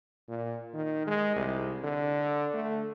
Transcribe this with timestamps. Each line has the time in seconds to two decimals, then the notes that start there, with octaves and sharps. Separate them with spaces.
0.29 A#2
0.74 D#3
1.07 G#3
1.36 C2
1.84 D3
2.54 A3